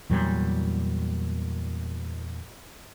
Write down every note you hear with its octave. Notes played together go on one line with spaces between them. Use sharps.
E2 A#2 F#3 G3